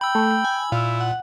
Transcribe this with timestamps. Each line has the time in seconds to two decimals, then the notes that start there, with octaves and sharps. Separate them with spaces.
0.01 G5 B5 E6
0.15 A3
0.45 G#5
0.72 A#2 E4 F5
1.01 F#5